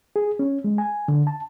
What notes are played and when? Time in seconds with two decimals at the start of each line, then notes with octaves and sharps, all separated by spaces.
0.16 G#4
0.39 C#4
0.64 G#3
0.78 G#5
1.08 D3
1.27 A5